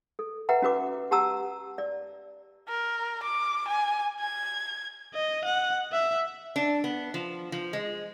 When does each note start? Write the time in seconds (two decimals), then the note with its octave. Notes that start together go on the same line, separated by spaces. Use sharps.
0.19 A4
0.49 B4 E5 F#5 G5 A#5
0.62 C#4 F#4 B4 D6
1.11 G4 F#5 A5 A#5 E6
1.78 D5
2.69 A#4
3.23 D6
3.68 G#5
4.20 G#6
5.14 D#5
5.44 F#5
5.92 E5
6.56 D4
6.84 B3
7.14 F3
7.52 F3
7.73 G#3